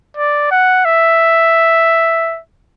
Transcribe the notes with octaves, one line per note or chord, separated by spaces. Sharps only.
D5
F#5
E5